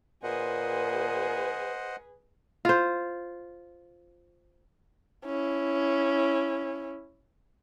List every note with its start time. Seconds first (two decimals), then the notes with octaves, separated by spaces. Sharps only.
0.23 A#2 G#4 B4 C5 D#5 F#5
2.65 F4 C5
5.26 C#4 E4